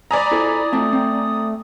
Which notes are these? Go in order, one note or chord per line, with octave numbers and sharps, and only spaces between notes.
D5 G#5 A#5 B5 D#6
E4 A4 C5
A3 C4 A5
C4